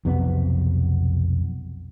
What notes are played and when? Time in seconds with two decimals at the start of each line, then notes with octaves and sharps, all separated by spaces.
0.05 B1 F2 C3 B3